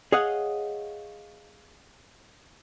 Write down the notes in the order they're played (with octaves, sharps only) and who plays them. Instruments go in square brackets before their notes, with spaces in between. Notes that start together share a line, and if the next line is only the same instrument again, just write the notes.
[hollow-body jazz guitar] G#4 C#5 D#5 F5 F#5